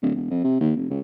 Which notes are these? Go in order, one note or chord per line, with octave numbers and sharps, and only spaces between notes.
D1
E1
F2
C3
D#2
F1
C#2